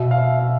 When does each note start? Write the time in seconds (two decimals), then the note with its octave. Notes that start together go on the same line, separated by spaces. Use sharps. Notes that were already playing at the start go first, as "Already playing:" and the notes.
Already playing: B2 E5
0.11 F5
0.18 E5
0.39 E5